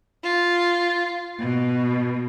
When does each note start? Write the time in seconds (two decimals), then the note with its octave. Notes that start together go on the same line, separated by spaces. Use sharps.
0.23 F4
1.40 B2